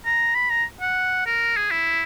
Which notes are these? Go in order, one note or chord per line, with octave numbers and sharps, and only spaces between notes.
A#5
B5
A#5
F#5
A#4
G#4
E4